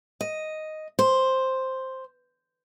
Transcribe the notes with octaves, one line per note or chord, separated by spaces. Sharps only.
D#5
C5